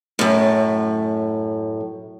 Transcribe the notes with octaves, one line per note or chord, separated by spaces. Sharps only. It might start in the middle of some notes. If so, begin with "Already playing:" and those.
F#2 A2